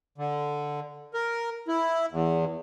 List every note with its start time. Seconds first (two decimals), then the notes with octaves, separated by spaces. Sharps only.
0.18 D3
1.14 A#4
1.68 E4
2.11 E2